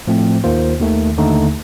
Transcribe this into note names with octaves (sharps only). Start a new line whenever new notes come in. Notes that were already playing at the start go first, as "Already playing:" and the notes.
A2 F3 A3 C4
D#2 D#3 A#3 F4 C5
D#2 D#3 A3
D#2 D3 A3 D#4